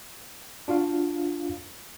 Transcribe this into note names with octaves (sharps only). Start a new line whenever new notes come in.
D4 F4 F#4 F5